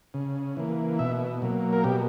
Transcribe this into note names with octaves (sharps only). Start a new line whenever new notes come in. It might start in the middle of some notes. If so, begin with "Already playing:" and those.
C#3
E3 A#3
B2 E5
F#3 A#3
A#4
B2 G4